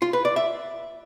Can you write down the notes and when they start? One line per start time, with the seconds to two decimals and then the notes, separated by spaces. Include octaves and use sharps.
0.02 F4
0.13 B4
0.25 D5
0.36 E5